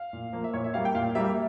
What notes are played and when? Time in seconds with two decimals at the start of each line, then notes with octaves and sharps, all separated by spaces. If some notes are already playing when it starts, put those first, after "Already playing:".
Already playing: F5
0.13 A#2
0.33 F3 A#3
0.44 E5
0.53 A#2 C#5
0.64 E5
0.74 G3 A#3 F5
0.85 G5
0.95 A#2 F5
1.15 G3 A#3 E5